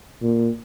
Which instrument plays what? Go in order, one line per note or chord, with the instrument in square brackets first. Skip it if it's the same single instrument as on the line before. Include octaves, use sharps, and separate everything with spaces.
[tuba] A#2